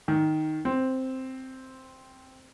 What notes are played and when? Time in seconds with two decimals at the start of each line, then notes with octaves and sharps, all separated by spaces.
0.08 D#3
0.65 C4